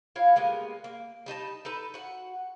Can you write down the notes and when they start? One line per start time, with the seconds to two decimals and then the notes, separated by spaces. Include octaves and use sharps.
0.16 E4 F4 C#5 F5
0.36 G3 G#3 A#3 B3
0.84 A#3
1.26 G3 D#4 D#5 A5
1.65 D#4 A4 B4
1.94 F#4 F#5